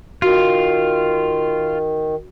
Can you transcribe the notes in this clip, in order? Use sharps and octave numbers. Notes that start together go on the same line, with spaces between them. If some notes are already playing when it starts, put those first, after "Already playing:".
D#3 F4 F#4